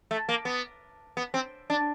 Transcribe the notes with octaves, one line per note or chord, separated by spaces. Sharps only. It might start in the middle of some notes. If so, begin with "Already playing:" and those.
A3
A#3
B3
B3
C4
D4